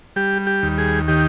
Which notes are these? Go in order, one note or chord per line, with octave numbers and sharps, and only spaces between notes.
G3 G4
G4
D#2
G#4
D#3 G4